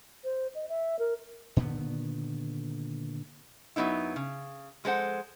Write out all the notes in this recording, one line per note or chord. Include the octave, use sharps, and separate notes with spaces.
C5
D#5
E5
A#4
A#2 D3 D#3 B3
F#2 F#3 B3 D#4 E4
C#3
F2 G#3 A4 C5 F#5